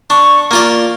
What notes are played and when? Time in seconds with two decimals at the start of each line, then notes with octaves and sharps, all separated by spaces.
0.10 D4 C#6
0.51 A#3 F4 D5